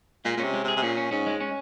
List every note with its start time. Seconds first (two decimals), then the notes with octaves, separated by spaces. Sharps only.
0.25 A#2 G#3
0.37 A#2
0.39 C3 C#4
0.54 G#3
0.64 C3
0.68 G#4
0.76 C3
0.83 A#2 C#4
0.97 C#4
1.11 G#2 C#4
1.27 G#3
1.40 C#4